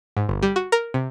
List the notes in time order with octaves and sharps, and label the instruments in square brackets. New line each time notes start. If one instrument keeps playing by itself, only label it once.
[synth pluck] G#2
G1
G3
F#4
A#4
C3